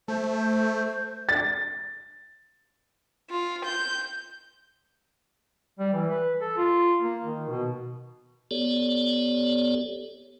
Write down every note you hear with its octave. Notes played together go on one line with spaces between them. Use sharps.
A3 C5
C5
A6
F4
G6
G3
E3
B4
A4
F4
A#3
D#3
B2
B3 G4 A4 C#5 D5